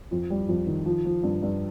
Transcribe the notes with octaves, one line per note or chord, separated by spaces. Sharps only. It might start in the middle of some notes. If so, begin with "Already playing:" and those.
F2
G3
F2
D#3
F3
F3
G2
G2